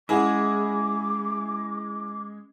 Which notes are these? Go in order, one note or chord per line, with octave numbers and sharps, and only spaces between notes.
G#3 C#4 E4 G#4 F#5 D6